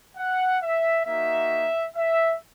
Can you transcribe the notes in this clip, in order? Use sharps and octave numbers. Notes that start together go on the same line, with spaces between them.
F#5
E5
A#3 D#4 F#4 E5
E5